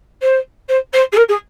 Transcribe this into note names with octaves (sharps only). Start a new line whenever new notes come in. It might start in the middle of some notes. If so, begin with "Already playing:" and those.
C5
C5
C5
G#4
A#4
G#4